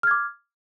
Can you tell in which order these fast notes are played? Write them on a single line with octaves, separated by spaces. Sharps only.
F6 G#6 D6